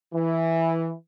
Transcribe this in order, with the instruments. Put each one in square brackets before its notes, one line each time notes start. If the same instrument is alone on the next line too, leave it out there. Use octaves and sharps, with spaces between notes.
[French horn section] E3